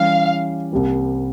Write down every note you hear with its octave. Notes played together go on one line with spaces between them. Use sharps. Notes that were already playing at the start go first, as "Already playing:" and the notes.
Already playing: E3 G3 C#4 G4 F5
C2 C3 G3 A#3